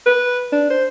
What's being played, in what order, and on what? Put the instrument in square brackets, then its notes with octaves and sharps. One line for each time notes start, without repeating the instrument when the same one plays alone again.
[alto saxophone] B4
D4
C5